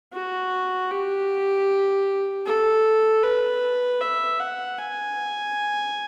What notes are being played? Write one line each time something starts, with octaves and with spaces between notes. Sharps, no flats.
F#4
G4
A4
B4
E5
F#5
G#5